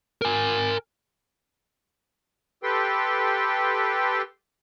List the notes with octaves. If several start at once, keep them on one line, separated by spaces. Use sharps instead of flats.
A#4 G#5
G4 A4 B4 G5 C6